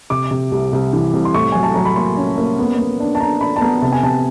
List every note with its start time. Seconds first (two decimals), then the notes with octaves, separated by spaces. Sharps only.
0.10 C3 D6
0.31 C3
0.52 C2
0.73 C2
0.93 E3
1.13 C2
1.25 C6
1.34 A2 C#6
1.52 F#3 G#5
1.63 A5
1.74 F#3 A#5
1.85 B5
1.96 A#3 C6
2.17 C#4
2.38 A#3
2.59 B3
2.79 B3
3.00 D4
3.15 A5
3.20 D4 A#5
3.41 D4 B5
3.56 A5
3.61 B3 A#5
3.82 C3 A5
3.92 G#5
4.03 C3 A5